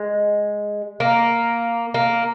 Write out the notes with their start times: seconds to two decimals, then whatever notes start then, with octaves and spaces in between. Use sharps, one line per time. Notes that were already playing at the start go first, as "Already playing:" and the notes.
Already playing: G#3
1.00 A#3
1.94 A#3